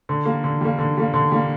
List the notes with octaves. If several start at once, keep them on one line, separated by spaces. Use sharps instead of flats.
D3
G3 A#3
D3
G3 A#3
D3
G3 A#3
D3
G3 A#3